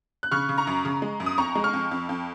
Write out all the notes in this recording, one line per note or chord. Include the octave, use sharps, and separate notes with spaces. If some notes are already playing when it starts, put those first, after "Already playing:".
F#6
C#3 C#6 F6
C#3
A#5 C#6
F#2
C#3
G#3
F#2
D#6
F2 A#5 C#6
G#3
C#6 F6
F2
F2
F2